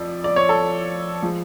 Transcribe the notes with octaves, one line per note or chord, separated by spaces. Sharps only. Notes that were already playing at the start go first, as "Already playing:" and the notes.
Already playing: F2 F3 D5
D5
C#5
A4
F3 G#3